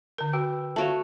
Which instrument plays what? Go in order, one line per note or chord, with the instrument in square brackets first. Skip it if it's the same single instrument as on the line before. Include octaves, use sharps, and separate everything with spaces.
[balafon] D3 A#4
[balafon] F#4 [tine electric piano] B4 G5 E6
[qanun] A3 F#4 C#5 [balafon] F5 A5